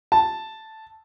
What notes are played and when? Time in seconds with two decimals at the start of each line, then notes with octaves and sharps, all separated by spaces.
0.12 A5